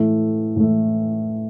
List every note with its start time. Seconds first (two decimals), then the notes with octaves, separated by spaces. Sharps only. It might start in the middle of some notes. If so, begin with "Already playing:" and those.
Already playing: A2 E3 A3
0.56 A2 E3 A3